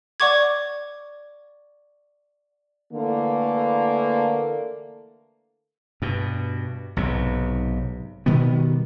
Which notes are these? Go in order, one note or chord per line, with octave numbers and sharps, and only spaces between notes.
D5 F#5 C#6 D6 G#6
D3 E3 A3 A#3
G2 B2
B1 G#2 C3
B2 D#3 G3 B3